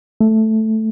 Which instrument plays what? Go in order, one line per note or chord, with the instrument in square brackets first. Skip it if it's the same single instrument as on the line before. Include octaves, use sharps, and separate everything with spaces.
[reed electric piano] A3